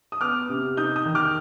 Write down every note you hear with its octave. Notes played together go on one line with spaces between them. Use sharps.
D#6
B3 D6 F6
C3
D#4 D#6 G6
D#6 G6
D#3
D6 F6